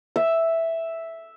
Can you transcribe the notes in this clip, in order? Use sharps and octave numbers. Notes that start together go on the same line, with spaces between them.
E5